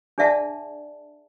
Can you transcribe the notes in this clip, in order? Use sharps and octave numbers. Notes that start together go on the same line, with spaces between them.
D4 G#4 D5 E5 F#5 A5